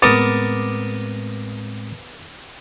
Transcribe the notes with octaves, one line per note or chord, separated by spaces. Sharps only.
A2 G#3 B3 C4 A#4 D6 D#6 A6